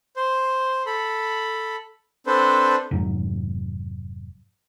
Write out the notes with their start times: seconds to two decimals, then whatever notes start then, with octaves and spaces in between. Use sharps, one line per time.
0.16 C5
0.86 A4 B5
2.27 C4 D4 A4 B4 C5
2.91 F1 D#2 G#2 F#3